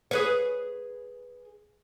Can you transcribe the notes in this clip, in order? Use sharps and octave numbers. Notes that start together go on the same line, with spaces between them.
G#4 B4 C#5